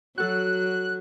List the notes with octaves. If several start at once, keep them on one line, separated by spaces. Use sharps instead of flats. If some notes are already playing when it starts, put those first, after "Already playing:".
F#3 F#4 A4 F#6